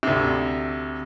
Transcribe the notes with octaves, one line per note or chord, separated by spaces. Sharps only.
D2 C3